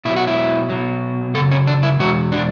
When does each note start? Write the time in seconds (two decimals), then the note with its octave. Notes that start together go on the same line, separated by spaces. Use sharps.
0.05 B2 F#3 E4
0.16 F#4
0.27 E4
0.69 B2 F#3
1.34 F#2 C#3 A4
1.51 C#4
1.67 D4
1.83 E4
1.99 E2 B2 G#3 F#4
2.32 D4